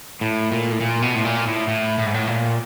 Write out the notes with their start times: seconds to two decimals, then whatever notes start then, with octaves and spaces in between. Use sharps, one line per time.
0.21 A2
0.52 A#2
0.72 A2
0.81 A#2
1.02 B2
1.15 A2
1.25 A#2
1.47 A2
1.68 A2
1.98 A2
2.06 G#2
2.14 A2
2.27 A#2